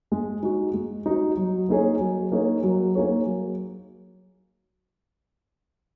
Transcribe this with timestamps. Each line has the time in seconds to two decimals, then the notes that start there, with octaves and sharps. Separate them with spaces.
0.12 G#3
0.43 D#4 F#4
0.74 G#3
1.06 D#4 F#4
1.37 F#3
1.69 A#3 D#4 G#4 C#5
2.00 F#3
2.32 A#3 D#4 G#4 C#5
2.63 F#3
2.95 A#3 D#4 G#4 C#5
3.26 F#3